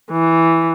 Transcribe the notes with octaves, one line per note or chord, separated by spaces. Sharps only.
E3